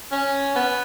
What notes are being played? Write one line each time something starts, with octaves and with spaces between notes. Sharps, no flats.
C#4
B3